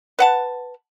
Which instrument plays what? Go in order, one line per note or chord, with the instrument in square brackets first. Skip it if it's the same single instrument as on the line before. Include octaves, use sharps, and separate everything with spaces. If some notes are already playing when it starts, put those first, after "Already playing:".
[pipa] B4 F#5 A5